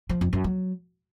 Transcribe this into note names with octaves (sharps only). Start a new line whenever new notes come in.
F3
F2
F#2
F#3